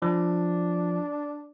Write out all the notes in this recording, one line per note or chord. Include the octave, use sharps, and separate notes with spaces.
F3 D4